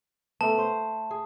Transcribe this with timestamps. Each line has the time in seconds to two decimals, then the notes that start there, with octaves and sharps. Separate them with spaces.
0.41 A3 B3 A5
0.58 C5
1.11 G#4